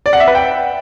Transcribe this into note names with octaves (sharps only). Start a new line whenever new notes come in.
D5
F#5
E5
B4
G5